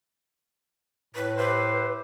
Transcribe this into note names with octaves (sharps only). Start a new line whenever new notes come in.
A2 B4
E4 G4 B4 C5